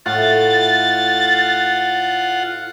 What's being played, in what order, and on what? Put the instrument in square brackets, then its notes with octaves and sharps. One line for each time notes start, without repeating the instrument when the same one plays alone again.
[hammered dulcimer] A2 [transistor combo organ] F4 F#5 [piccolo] A6